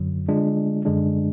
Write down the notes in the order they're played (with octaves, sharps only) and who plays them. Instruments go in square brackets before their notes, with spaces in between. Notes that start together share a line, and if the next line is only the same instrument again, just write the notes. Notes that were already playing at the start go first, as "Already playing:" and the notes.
Already playing: [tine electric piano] F#2 D3 F#3
D3 G#3 D4 F4
F#2 D3 G#3 D4